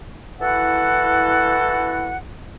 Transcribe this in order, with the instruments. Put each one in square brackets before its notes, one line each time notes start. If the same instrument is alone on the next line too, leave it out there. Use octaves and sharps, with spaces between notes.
[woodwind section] E3 E4 F#4 A4 F#5